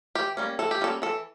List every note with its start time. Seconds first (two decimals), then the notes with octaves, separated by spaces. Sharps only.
0.15 E3 G4
0.37 G3 A#3 C#4
0.59 E3 A4
0.71 G4
0.81 G3 A#3 C#4 A4
1.02 E3 A4